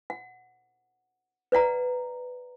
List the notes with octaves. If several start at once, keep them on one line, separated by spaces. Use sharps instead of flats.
F#5
B4 D5 F#5 A#5